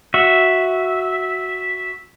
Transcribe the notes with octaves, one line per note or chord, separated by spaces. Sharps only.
F#4 E5